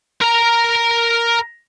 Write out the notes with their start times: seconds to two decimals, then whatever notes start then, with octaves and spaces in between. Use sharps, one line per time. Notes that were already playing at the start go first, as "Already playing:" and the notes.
0.21 A#4 A#5